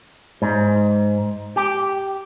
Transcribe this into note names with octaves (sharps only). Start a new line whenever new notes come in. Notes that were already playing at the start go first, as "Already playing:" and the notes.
G#2
G4